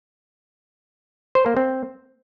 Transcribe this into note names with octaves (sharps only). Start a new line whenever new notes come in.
C5
A#3
C4